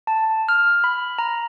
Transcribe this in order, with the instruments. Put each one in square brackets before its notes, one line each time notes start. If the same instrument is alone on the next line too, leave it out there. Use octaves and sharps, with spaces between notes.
[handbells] A5
F6
B5
A#5